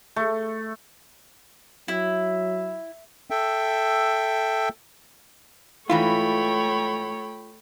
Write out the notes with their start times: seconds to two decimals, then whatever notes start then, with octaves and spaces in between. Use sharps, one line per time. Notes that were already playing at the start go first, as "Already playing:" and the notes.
0.16 A3
1.88 F#3 E4
3.30 A4 E5 G5
5.90 G#2 E3 A3 E4 F4 C#5 G5 B5